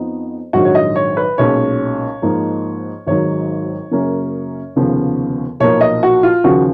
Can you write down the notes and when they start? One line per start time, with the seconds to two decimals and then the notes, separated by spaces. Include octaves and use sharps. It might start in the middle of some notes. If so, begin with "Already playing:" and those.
Already playing: F2 F3 B3 D#4
0.53 A#1 G#2 D#3 F#3 F#4
0.65 C#5
0.75 D#5
0.96 C#5
1.17 B4
1.38 B1 A#2 G#3 C#4 C#5
2.22 G#2 F3 A#3 D#4
3.07 G#1 G#2 D#3 F#3 C#5
3.91 F#2 C#3 F#3 A#3 C#4
4.76 F1 D#2 C#3 F3 B3
5.60 B1 A#2 F3 A#3 C#5
5.81 D#5
6.03 F#4
6.23 F4
6.44 D#2 C#3 F3 F#4